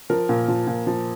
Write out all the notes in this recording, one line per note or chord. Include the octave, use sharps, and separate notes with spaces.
F3 A#4
A#2
F3
A#2
F3